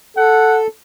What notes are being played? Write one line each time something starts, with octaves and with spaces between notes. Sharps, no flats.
A4 F#5